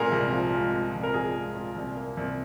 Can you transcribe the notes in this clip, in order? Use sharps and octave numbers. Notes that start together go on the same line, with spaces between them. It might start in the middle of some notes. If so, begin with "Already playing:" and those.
Already playing: C2 A#2 F3 G#3 G#4 A#4
C2
F3
G#3
A#2
C2
A#4
F3 G#4
G#3
A#2
C2
A#3
C2